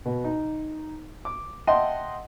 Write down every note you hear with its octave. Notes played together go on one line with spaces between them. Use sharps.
B2
D#4
D6
D#5 E5 F#5 G5 A5 C6